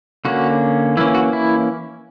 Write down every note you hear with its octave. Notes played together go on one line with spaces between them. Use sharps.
D3 A#3 C#4 F#4
E3 A#3 C#4 E4
F#4
E4